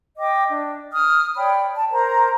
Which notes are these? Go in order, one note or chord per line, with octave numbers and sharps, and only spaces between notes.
D#5 G5 D6
D4
D#6 F6
C#5 D5 G5 B5
A5
A#4 C5 A#5